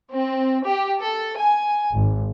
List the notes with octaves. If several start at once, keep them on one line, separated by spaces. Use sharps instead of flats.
C4
G4
A4
G#5
G#1